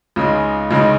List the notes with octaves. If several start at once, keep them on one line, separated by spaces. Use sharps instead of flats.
C#2 C#3 G#3 D#4
C#2 C#3 G#3 D#4